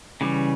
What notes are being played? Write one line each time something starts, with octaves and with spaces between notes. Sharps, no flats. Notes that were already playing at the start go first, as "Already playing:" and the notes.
C#3 E3 G3